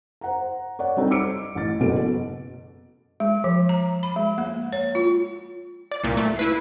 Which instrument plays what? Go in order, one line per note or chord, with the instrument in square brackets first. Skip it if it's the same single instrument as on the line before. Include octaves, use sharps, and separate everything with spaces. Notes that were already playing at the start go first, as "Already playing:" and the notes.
[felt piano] C5 F#5 A#5
C#5 D5 F#5
G3 C4 D#4 A4 D#5
D6 E6 C#7 D7
A1 A6
F#1 B2 B3 A4 D7
[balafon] G#3
F3
A#5
B5
G#3
A#3
C#5
F4
[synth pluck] D5
C2 A#2
A3
E4 B4 C7